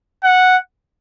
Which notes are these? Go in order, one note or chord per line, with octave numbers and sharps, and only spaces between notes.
F#5